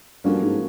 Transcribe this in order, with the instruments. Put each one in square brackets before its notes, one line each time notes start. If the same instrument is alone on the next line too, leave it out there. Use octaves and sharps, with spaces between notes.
[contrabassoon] G2 [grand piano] F3 A#3 C#4 F#4 A4
[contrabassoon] G#2